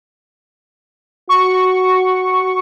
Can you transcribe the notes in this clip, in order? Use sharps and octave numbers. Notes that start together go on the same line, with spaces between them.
F#4 C#6